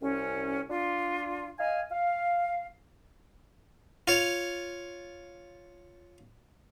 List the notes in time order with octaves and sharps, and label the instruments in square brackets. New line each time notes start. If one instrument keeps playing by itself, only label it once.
[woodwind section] C2 C#4
D4 F4
D#5 F5 G#5
F5
[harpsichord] F4 C#5